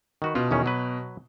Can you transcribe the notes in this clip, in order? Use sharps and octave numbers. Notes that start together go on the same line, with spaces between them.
D#3 F#4 B4
B2 F4
E2 D#3 C#4
F#3 B4